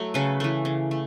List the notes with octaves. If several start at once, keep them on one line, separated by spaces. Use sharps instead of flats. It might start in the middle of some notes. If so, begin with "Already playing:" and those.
Already playing: F#3 A3
C#3 A4 B4
E3 A3
C#3
A3